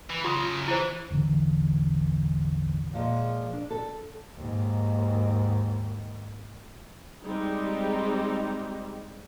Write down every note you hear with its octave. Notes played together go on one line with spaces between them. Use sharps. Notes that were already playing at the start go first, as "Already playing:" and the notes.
E3
C#3 F#3 F4 C6 D#6
E3 E4 C5
E1 A1 D3 E3
A#2 F3 G#3
D4
A4
D#2 G#2
G3 G#3 C4 D#4 G4